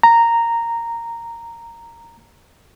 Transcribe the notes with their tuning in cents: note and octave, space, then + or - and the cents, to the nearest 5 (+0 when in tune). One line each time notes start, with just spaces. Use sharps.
A#5 -10